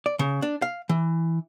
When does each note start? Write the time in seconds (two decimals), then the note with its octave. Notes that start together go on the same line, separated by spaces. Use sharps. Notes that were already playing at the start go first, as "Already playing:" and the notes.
0.06 D5
0.19 C#3
0.42 D4
0.62 F5
0.89 E3